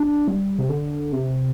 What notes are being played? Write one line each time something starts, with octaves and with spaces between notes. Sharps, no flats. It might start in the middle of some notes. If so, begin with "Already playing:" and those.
Already playing: D4
G3
C3
D3
C3